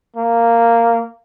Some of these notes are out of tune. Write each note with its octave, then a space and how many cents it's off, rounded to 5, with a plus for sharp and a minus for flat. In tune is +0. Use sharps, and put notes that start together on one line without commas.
A#3 -10